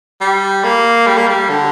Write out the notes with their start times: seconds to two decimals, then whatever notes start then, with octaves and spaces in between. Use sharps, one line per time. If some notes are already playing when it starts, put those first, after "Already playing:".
0.21 G3
0.64 A#3
1.06 G3
1.17 A#3
1.28 G3
1.49 D3